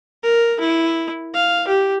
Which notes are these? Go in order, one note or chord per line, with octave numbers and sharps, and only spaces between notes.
A#4
E4
F5
G4